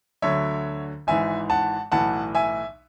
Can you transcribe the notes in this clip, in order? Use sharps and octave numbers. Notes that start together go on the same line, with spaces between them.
D2 D3 F#3 C#5 E5
G#1 G#2 E3 E5 G#5
F#5 A5
B1 A2 E3 F#5 A5
E5 G#5